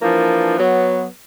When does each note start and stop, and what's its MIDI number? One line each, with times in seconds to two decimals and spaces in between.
0.01 0.54 52
0.01 0.54 53
0.01 0.54 58
0.01 0.54 62
0.58 1.05 54
0.58 1.05 59